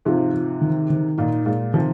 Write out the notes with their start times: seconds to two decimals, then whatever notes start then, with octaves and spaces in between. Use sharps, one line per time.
0.05 G#2 C3 F3
0.34 F3
0.61 D#3
0.90 D#3
1.18 A#2 D#4
1.45 A#2 G#3
1.74 C3 D#3 F3